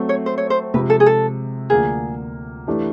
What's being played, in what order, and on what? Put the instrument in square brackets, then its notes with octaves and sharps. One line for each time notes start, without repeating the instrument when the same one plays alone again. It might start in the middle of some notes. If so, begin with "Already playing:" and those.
Already playing: [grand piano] F#3 A3 C4
[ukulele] C#5
C5
C#5
C5
[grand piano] C3 F3 G#3 [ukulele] B4
[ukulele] A4
G#4
A4
[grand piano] D2 D3 F3 A#3 [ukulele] G#4
[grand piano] E3 A3 D4 G4